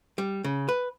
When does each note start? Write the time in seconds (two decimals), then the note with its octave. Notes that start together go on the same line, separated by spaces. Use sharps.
0.18 G3
0.44 C#3
0.69 B4